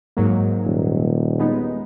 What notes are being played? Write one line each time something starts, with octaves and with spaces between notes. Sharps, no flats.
G#2 F#3 A#3
D#1
G#3 B3 D#4